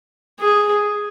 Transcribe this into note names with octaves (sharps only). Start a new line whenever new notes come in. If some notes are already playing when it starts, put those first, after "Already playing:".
G#4